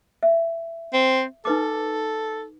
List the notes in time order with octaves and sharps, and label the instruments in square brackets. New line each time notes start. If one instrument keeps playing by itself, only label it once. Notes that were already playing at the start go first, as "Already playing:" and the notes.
[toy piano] E5
[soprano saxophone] C4
[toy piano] D#4 B4 D6 [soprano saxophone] A4